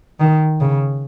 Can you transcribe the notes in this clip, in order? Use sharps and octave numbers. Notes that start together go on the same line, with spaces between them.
D#3
C#3